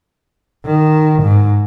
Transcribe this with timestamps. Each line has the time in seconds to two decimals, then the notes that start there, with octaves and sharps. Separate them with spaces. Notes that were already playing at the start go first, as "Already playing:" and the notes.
0.65 D#3
1.22 G#2